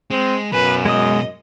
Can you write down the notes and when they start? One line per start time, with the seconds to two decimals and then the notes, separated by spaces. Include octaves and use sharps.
0.11 G#3 C4
0.53 F#2 B2 B4 G#5
0.85 G#3 D#5 D#6